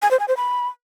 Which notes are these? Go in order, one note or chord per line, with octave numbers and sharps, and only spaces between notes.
G#5
C5
G#5
C5
B5